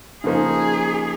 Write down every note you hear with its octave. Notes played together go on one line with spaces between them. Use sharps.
C#3 F3 A#3 D#4 G#4